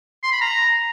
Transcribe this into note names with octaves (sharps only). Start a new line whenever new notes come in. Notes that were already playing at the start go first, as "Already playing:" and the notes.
C6
B5
A#5